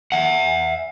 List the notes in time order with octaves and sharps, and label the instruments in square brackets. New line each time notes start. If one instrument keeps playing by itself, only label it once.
[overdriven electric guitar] E5 F#5